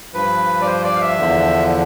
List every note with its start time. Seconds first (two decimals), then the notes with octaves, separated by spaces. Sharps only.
0.14 G2 F3 B4
0.61 D5
0.66 C5
0.84 D5
0.95 F5
1.01 E5
1.19 E2 D3 F3